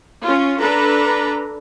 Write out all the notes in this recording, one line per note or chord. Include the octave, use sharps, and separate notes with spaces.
C#4 F4
D4 A4 B4 A#5